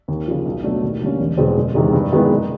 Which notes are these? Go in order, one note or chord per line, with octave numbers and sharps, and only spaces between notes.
D#2
C#3 F3
B1
B2 F#3 A3 D4
D#2
D3 G3 A#3 C#4
E1
E2 B2 G#3 C4
F#1
E2 C3 D#3 G#3
G2
D#3 G#3 B3 E4
F#1